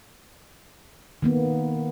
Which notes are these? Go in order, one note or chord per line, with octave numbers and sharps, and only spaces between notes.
D#3 A#3 B3